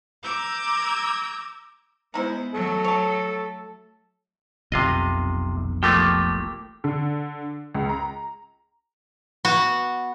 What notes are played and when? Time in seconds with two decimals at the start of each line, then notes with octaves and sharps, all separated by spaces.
0.23 A#5 D6 E6 G6 G#6
2.14 G#3 B3 D#4 E4 C5
2.54 F#3 A3 A4
2.85 C#5 A5
4.72 F1 B1 C3 F4 D#5
5.83 F3 A3 A#3 G4
6.84 D3
7.75 C#2
7.89 A#5
9.45 B3 F#4